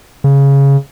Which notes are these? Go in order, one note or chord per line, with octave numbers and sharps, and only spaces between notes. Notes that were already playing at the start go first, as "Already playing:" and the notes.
C#3